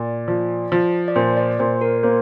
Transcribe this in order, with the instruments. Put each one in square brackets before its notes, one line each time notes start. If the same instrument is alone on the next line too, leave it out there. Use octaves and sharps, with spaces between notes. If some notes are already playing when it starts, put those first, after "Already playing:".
Already playing: [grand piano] A#2 [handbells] D5
[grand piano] F3
F3
[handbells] D5
[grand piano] A#2 [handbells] C5
[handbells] D5
[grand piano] A#2 [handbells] C5
[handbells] A#4
[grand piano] A#3 [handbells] C5